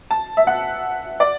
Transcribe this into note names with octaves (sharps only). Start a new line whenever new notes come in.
A5
E5
F#5
D5